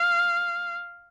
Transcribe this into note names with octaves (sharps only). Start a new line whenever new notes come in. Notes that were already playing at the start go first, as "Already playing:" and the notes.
Already playing: F5